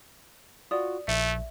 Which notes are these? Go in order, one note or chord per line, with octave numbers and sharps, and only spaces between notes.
F4 F#4 D5 D#6
A#1 A3 E5